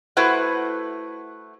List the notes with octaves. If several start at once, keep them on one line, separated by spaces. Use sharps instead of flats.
A3 E4 F#4 B4 C5 F#5